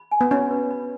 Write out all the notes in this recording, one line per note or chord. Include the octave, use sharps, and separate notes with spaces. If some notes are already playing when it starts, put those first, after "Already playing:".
Already playing: B5
G#5
B3
C#4 F#4
B4
B5